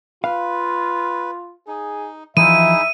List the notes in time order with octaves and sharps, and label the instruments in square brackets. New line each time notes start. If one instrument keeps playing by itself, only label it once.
[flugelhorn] F4 [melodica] B4 [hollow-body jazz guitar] F5
[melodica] D#4 [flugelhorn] G#4
[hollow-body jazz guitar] E3 F3 [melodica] D#4 E4 G#4 [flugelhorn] E5 [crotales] D#7